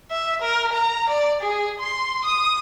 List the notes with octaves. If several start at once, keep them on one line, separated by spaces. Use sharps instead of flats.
E5
A#4
A#5
D5
G#4
C6
D#6